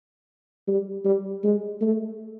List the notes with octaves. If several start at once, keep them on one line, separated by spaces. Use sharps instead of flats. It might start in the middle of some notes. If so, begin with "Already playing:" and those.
G3
G3
G#3
A3